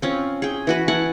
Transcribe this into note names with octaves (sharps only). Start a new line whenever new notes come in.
C4 C#4 F4
G#4 G5
E3 F#4 B4
E4 F#5 G#5 A5